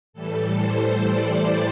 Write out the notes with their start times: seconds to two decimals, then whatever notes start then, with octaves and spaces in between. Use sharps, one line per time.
0.13 A2 E3 G3 A4
0.56 C5
1.00 D5